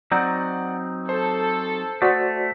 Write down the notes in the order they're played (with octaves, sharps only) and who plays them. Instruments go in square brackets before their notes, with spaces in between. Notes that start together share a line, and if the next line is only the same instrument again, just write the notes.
[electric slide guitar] F#3 C4 D#4 [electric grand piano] D5 F#5 [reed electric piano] A#5
[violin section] A4 [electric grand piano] C5
[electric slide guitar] A3 [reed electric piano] F#4 C5 D5 [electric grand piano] D#6 B6